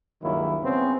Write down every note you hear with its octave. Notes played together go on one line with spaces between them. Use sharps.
C#2 G2 D#3 F#3 A#3 E4
C#3 B3 C4